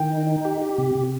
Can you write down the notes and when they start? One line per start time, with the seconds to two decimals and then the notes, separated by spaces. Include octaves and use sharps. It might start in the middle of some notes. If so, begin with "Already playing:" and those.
Already playing: D#3 G5
0.10 D#4
0.27 D#4
0.45 G4
0.61 G4
0.78 C3
0.95 C3